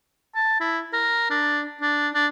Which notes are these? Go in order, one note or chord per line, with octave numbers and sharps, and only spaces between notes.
A5
E4
A#4
D4
D4
D4